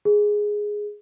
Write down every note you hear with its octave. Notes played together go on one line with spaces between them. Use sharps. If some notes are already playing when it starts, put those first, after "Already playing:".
G#4